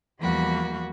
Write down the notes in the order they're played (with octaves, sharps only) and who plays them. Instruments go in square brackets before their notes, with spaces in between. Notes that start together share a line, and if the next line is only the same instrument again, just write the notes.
[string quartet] E2 F3 G3 A#3 F#4 B5